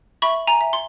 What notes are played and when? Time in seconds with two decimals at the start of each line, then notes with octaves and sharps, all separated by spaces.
0.22 E5 B5 C#6
0.47 G#5 A#5
0.61 E5
0.73 C6